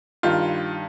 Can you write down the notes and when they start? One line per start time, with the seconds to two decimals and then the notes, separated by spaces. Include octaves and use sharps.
0.23 G2 D#3 F4